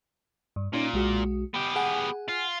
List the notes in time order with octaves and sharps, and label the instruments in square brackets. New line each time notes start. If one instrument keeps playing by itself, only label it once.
[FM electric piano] G2
[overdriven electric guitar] A#2 [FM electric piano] C#4 D#4
[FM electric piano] B1 G#3 F#4
[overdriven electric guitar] B3 G4
[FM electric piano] G#4 F#5 G#5
[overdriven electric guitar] F4